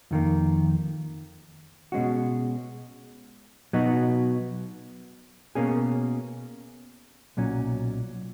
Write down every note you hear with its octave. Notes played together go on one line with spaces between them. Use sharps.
F2 D#3 A#3
B2 G#3 C#4 F#4
B2 F#3 B3 D#4 F#4
B2 A#3 C#4 G#4
B1 A#2 F#3 C#4